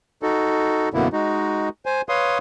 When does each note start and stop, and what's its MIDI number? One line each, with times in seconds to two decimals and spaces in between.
0.23 0.89 63
0.23 0.89 66
0.23 0.89 69
0.94 1.08 42
0.94 1.08 47
0.94 1.08 50
0.94 1.08 58
0.94 1.08 59
0.94 1.08 64
1.13 1.69 56
1.13 1.69 63
1.13 1.69 66
1.86 2.02 72
1.86 2.02 80
2.09 2.38 71
2.09 2.38 73
2.09 2.38 77
2.09 2.38 84
2.09 2.38 87